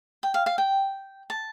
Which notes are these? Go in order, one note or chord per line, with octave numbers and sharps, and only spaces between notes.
G5
F5
F5
G5
A5